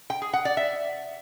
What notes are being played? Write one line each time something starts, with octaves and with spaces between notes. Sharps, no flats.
G5
G#4
F#5
D5
E5